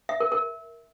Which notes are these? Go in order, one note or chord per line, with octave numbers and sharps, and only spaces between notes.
E5
A#4
A#4